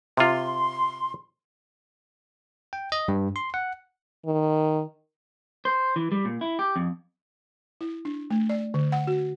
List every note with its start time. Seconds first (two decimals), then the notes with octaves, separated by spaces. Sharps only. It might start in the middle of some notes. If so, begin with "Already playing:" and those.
0.17 C3 F4 C6
2.73 G5
2.92 D#5
3.08 G2
3.36 C6
3.54 F#5
4.26 D#3
5.65 C5
5.96 E3
6.12 G3
6.25 A#2
6.41 E4
6.59 G4
6.76 F2
7.81 E4
8.05 D4
8.31 A3
8.50 D5
8.74 D3
8.92 F#5
9.07 F#4